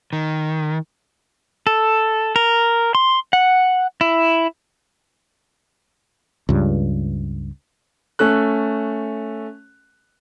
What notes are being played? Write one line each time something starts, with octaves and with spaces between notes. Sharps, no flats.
D#3
A4
A#4
C6
F#5
E4
C#2 G2
A3 C#4 A4 F#6